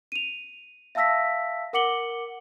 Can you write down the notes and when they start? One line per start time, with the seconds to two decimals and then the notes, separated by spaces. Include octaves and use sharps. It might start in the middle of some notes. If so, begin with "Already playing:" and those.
0.12 D#7 F7
0.95 E5 F5 A5 E6 A#6 B6
1.73 A#4 F#5 D6 C#7 F#7 G7